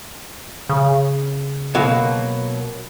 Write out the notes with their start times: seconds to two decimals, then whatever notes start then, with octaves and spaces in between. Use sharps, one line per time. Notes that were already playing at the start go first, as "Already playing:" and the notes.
0.69 C#3
1.75 B2 F#3 A#3